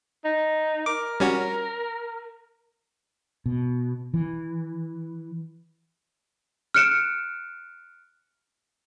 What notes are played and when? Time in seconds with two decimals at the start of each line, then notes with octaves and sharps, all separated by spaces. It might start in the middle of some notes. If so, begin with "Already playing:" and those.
0.25 D#4
0.86 A#4 D6
1.20 G3 C#4 F#4
3.46 B2
4.14 E3
6.74 F6 F#6 C#7 D7 E7